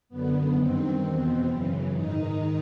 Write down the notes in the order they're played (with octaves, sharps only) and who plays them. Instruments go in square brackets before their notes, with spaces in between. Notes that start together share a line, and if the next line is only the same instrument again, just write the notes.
[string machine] F#2 D3 B3
G2 D#3 C4
E2 B2 C4
F#2 C#3 E3
G#2 D#3 D#4